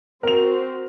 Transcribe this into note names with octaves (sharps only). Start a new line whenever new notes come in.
C4 F#4 A#4 F7